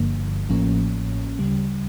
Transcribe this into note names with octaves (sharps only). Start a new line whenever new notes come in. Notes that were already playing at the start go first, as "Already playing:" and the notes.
Already playing: G1 G2 D3 F3 A#3
A1 A2 F3 A#3 C#4
D2 C#3 G3